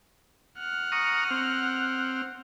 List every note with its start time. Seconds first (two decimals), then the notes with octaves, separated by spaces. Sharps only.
0.59 F#5 F6
0.92 A#5 C#6 D#6
1.31 C4